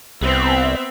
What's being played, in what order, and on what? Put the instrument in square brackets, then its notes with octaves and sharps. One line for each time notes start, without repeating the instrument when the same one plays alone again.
[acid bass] C2 [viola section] B3 C4 E5